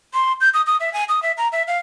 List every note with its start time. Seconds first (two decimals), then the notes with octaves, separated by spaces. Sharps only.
0.13 C6
0.41 G6
0.54 D#6
0.67 D#6
0.80 E5
0.93 G#5
1.09 D#6
1.23 E5
1.38 A#5
1.52 E5
1.67 F5